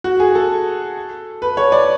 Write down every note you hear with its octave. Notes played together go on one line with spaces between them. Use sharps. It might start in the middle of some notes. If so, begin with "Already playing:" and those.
F#4
G#4
A4
B4
C#5
D5